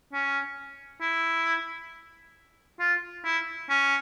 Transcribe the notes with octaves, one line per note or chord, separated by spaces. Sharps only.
C#4
E4
F4
E4
C#4